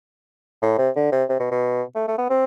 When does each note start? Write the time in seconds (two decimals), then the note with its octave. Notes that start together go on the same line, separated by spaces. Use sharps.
0.63 A2
0.78 C3
0.96 D3
1.12 C3
1.30 C3
1.40 B2
1.51 B2
1.96 A3
2.08 A3
2.18 B3
2.30 C4